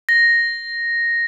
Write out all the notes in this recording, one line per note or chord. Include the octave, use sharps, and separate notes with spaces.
A#6